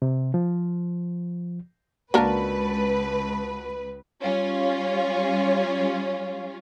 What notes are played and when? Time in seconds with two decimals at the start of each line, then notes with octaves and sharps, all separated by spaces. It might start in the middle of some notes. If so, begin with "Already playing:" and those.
0.02 C3
0.34 F3
2.14 C#2 A#3 D4 F#4 A#4 B4 A5
4.21 G3 C#4 F4